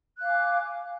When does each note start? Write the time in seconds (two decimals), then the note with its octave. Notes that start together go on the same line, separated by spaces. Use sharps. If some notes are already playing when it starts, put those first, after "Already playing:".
0.18 F#6
0.22 F5
0.25 D6
0.28 G#5